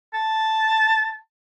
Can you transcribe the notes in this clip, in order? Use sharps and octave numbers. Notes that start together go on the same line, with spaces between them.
A5